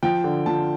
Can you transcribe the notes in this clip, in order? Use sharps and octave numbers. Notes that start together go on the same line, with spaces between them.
F3 G5
D3
F3 A5